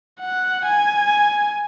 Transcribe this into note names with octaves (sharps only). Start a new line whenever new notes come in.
F#5
G#5